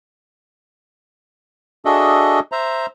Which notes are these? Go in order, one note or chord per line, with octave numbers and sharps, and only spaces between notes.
D4 F#4 G#4 A4 D#5 E5
C5 E5 A#5